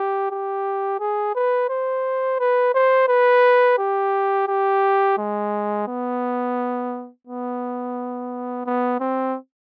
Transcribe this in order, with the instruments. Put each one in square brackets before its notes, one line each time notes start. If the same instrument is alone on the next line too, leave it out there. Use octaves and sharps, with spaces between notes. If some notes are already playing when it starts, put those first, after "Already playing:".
Already playing: [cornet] G4
G4
G#4
B4
C5
B4
C5
B4
G4
G4
G#3
B3
B3
B3
C4